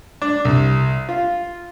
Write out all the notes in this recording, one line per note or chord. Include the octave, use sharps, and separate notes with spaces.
D4
C2
F4